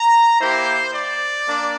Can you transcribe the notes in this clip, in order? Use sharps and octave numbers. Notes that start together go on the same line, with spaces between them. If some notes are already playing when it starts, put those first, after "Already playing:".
Already playing: A#5
A#3 E4 G4 C5
D5
A#3 D4